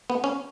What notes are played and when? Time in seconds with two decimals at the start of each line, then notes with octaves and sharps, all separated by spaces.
0.10 B3
0.24 C#4